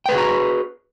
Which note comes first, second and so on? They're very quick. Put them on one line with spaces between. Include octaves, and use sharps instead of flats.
G5 B4 G#4 F#4 A#5